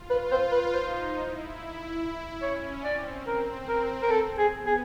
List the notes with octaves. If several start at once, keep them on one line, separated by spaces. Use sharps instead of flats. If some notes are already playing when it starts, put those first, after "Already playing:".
Already playing: F4
B4
C5
B4
D#4 C5
E4
C#4 C#5
C4 D5
C4 A#4
A#4
A#4
A4
G#4
B3
G#4